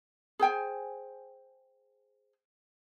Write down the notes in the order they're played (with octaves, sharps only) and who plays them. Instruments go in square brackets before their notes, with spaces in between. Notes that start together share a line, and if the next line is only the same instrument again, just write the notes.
[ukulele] G#4 C5 G5 G#5